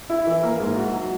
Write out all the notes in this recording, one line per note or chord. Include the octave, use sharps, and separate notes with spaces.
E4
E3
A#3
G#2
F#4
F#3